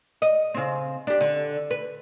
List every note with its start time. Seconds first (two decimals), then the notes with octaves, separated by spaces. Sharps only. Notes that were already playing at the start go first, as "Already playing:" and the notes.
0.22 D#5
0.54 C#3 C4
1.07 D4 G4
1.21 D3
1.71 B4